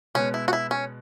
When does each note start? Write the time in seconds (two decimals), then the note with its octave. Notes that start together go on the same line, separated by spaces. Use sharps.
0.15 B2 G#3 B3 C#4
0.34 E4
0.48 F#4
0.53 E4
0.71 C#4